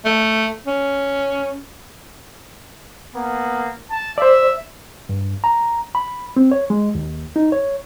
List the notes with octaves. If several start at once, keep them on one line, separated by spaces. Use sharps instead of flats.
A3
C#4
A#3 B3
A5
C5 D5 E5
G2
A#5
B5
C4
C#5
G#3
D#2
D#4
C#5